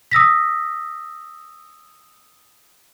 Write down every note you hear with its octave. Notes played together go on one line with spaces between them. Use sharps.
D#6 E6 A#6 B6